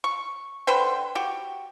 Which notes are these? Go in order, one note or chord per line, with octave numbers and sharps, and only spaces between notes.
C#6
D3 B4 C5 G5
F#4 G4